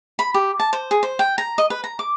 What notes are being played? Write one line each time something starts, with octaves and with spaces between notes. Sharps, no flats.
B5
G4
A5
C5
G#4
C5
G5
A#5
D#5
B4
A#5
D6